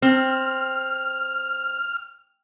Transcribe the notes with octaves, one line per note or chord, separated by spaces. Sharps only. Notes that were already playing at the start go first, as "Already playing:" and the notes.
C4 F6